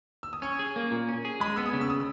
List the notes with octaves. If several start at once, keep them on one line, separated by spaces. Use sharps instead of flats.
E6
D#6
C#4 C#6
G#4
A#3
A#2
C#4
G#4
G#3 B5
B3 E6
D#6
C#3
E6
D#6